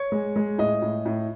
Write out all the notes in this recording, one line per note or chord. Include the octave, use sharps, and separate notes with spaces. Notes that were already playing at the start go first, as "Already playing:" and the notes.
Already playing: C#5
G#3
G#3
A2 D#5
A2
A2